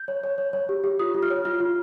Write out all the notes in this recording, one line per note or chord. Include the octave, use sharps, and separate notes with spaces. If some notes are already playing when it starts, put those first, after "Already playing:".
Already playing: G6
C#5
C#5
C#5
C#5
G4
G4
F4 D#6
F4
F6
C#5
F4 F6
F4